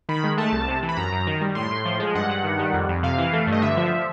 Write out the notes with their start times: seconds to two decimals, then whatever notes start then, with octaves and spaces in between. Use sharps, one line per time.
0.09 D#3 B5
0.24 G#3
0.37 A3 A5
0.52 C2
0.68 C3
0.83 E3
0.89 B5
0.97 F#2 A#5
1.12 F#2
1.27 D#3
1.41 G3
1.55 A2 C6
1.71 A2
1.85 F3
2.00 G#3
2.15 G2 F#5
2.29 G2
2.44 D#3
2.59 G3
2.73 F2
2.89 F2
3.03 C3 F5
3.18 E3
3.33 A3
3.47 G2
3.52 D#5
3.62 D3 E5
3.77 F3